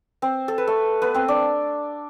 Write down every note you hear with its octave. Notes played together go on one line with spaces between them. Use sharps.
C4 C5
A4
B4
A3 A4
B3 B4
C4 C5
D4 D5